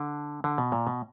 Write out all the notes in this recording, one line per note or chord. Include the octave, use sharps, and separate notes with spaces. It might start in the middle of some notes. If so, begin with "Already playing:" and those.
Already playing: D3
D3
B2
A#2
B2